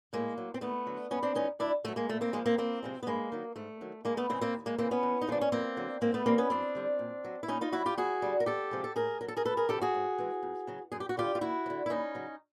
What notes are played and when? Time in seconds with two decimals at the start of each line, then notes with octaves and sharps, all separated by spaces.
0.13 A2 G#3 A#3
0.37 F#3
0.54 C4
0.61 D#2 A3 B3
0.86 D3 F#3
1.11 G2 B3 C#4
1.23 C4 D4
1.35 E3 G#3 C#4 D#4
1.59 D2 D4 E4
1.84 D3 F#3 A3
1.96 G#3 A#3
2.09 A#2 A3
2.21 A#3 C4
2.33 F3 G#3 A#3
2.46 A#3 C4
2.58 E2 A#3 C4
2.83 C3 F3 G#3
3.03 B3
3.06 G2 G#3 A#3
3.32 D#3 F#3
3.56 G#2 A3
3.81 D#3 F#3
4.05 D#2 G#3 A#3
4.17 A3 B3
4.29 C#3 E3 G#3 A#3 C4
4.41 A#3 C4
4.54 D#2
4.66 G#3 A#3
4.78 C#3 E3 A#3 C4
4.91 B3 C#4
5.03 E2
5.21 D#4
5.27 C#3 F3 G#3 D4
5.41 C#4
5.52 F2 A#3 C4
5.77 D3 F#3
6.01 G#2 A#3 C4
6.14 A3 B3
6.26 E3 G3 A#3 C4
6.38 B3 C#4
6.50 F#2 C4 D4
6.75 D3 G3
6.99 A#2
7.24 F#3
7.43 E4
7.48 A#2 C#4 D#4
7.61 D#4 F4
7.72 F#3 E4 F#4
7.86 F4 G4
7.97 F2 F#4 G#4
8.22 D3 G3
8.40 A#4
8.46 E2 G4 A4
8.71 C3 F3 G#3
8.84 A4
8.96 A2 G#4 A#4
9.21 F#3 A#4
9.28 A4
9.37 G#4 A#4
9.45 D2 A4 B4
9.57 G#4 A#4
9.69 C3 F3 G4 A4
9.81 F#4 G#4
9.94 G#2
10.18 E3 G#3
10.43 F2
10.67 C#3 F#3
10.92 F#2 G#4
11.00 G4
11.09 F#4
11.17 D3 G3 F4 G4
11.35 F4
11.41 D#2 E4 F#4
11.66 F#3
11.70 D3
11.86 E4
11.90 D#2 C#4 D#4
12.15 C#3 F#3